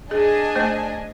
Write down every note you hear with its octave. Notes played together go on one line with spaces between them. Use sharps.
D4 G#4 D#5 G#5
A3 C5